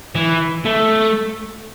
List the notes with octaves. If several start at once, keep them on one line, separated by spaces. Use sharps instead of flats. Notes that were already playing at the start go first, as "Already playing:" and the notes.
E3
A3